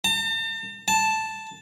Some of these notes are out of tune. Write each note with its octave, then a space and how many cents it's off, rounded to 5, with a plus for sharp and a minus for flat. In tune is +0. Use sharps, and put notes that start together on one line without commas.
A5 +45
A5 +0